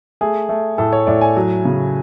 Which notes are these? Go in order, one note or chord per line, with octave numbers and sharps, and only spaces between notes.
A3 G#4
A3
A2 A4
C#5
A2 D5
G#5
F#3
C#3